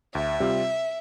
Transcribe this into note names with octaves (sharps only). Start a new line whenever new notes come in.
D2 E5
C3 G3 C4 F4